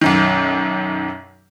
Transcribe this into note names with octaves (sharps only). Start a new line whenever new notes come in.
B1 F#2 D#3